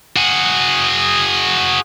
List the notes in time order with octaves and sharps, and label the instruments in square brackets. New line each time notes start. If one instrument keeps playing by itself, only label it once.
[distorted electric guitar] F#4 G#4